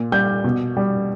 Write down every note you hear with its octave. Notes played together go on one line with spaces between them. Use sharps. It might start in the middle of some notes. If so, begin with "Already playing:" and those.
Already playing: A#2
G3 G6
B2
G3